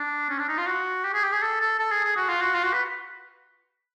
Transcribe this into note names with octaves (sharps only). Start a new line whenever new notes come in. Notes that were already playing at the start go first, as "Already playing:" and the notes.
Already playing: D4
C#4
D4
D#4
F4
F#4
G4
G#4
G4
G#4
A4
A4
A4
G#4
G#4
F#4
F4
F#4
F4
F#4
B4